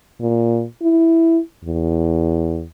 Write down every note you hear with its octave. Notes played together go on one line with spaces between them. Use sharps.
A#2
E4
E2